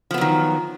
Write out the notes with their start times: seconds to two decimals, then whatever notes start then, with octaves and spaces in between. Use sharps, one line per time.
0.11 F3
0.14 B3
0.18 F#3
0.21 D#3